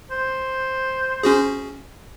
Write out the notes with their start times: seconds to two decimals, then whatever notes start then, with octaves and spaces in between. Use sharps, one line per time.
0.11 C5
1.23 C#4 F#4 G#4